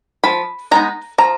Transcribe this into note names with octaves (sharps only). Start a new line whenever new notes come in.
F3 B5
G#3 B3 D#4 A#5
F3 A#5